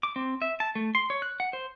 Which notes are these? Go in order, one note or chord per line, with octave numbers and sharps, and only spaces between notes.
D6
C4
E5
A5
A3
C6
C#5
F#6
F#5
C5